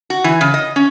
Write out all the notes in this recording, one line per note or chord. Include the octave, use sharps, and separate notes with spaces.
F#4
E3
C#3
D#5
C#4